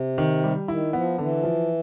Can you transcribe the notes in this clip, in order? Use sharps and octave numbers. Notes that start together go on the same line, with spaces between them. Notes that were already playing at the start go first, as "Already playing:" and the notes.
Already playing: C3
D#3
G3
D#3 E4
F3 B3
D3 E3
F3